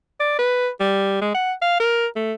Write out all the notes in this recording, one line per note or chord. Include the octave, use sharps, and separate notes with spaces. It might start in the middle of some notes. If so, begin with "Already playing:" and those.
D5
B4
G3
G#3
F#5
F5
A#4
A3